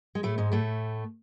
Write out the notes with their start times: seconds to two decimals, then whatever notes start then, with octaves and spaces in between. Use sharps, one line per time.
0.15 G#3
0.23 A2 A3
0.38 G#2 G#3
0.52 A2 A3